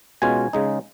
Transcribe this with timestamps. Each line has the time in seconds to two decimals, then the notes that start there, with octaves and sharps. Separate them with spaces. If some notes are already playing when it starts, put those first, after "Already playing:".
0.22 B2 G#3 C#4 F4 G#5
0.53 C#3 G#3 D#4